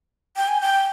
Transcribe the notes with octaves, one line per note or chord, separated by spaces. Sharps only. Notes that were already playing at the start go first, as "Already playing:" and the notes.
G5
G#5
G5